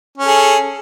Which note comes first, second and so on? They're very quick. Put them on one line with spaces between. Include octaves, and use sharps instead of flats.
C#4 A4 G#4